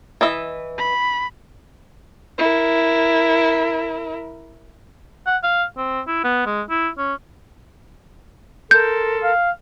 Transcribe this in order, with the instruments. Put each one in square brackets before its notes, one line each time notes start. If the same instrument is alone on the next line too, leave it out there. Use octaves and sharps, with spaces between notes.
[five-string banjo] E3 D#5 E5
[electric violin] B5
[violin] E4 A#4
[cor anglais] F#5
F5
C4
E4
B3
G#3
E4
C#4
[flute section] A4 A#4 C6 [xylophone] G6
[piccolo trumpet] F5